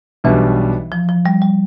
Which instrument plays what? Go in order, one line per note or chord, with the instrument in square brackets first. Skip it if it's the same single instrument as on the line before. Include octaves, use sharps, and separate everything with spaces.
[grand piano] B1 B2 G3 D4 [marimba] E3
[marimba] F3
F3
G3
G3